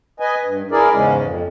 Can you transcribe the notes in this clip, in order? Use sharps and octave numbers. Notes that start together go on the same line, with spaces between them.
B4 D#5 G#5
G2
E4 G#4 A#4 D5
E2 G#2 C#3 G#3 C#4
F2